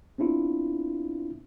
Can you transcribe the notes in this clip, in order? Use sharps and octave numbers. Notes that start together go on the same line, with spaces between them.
B3 C4 D4 E4 F4